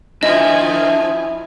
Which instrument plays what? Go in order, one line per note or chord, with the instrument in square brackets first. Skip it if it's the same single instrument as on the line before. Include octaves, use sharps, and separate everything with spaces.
[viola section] D#3 F3 G#5 [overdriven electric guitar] D4 E5 [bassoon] E4 [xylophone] D#5